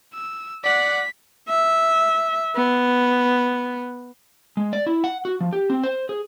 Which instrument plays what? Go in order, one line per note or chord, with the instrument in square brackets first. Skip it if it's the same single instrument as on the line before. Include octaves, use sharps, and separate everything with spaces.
[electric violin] E6
[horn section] D5 F#5 [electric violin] B6
[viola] E5
B3
[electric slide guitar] G#3
D5
E4
F#5
F#4
F3
G4
C4
C5
G#4